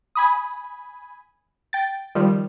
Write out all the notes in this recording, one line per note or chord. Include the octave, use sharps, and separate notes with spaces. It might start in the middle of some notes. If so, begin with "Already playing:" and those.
G#5 B5 D#6
G5 A6
D#3 F3 G3